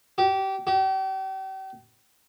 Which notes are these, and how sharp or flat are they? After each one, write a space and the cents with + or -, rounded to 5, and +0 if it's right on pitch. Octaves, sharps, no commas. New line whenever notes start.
G4 -25
G4 -40